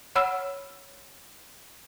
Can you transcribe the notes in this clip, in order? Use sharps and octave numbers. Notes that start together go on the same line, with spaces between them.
C#5 F#5 B5 E6 F6